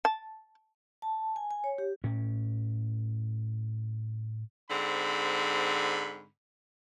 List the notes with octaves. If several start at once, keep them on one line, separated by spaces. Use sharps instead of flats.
A5
A5
G#5
G#5
C#5
G4
A2 C#4
G#2 D3 C4 B5